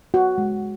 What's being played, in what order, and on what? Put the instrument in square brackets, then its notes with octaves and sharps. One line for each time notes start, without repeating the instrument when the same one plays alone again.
[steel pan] F#4
G#3